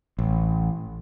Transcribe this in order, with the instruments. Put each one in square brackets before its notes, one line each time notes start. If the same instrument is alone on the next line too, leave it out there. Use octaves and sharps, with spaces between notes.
[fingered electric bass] A1